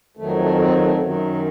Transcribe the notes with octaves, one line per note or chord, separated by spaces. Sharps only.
F2 D#3 F#3 A3
A3
C4
A3
F#2 D#3 F#3